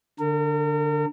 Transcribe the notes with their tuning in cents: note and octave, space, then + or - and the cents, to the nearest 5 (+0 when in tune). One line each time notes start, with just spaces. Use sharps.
D3 +0 A#4 -40